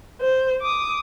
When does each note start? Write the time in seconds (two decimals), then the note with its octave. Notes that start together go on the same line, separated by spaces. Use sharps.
0.21 C5
0.62 D6 D#6